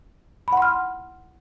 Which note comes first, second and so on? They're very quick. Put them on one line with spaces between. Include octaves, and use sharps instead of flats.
B5 F#5 C6 F6